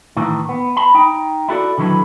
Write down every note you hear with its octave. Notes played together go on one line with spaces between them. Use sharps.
A2 D#3 E3
B3
A5 B5
D#4 G5
E4 F#4 A4 D5
D3 D#3 F#3 E4 A4 B4